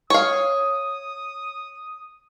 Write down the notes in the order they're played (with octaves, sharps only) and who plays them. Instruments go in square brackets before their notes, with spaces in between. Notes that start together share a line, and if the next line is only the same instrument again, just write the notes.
[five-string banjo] C#5 F5 [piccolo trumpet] D#6